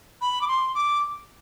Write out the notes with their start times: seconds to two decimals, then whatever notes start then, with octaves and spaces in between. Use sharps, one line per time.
0.21 B5
0.42 D6
0.48 C6
0.75 D6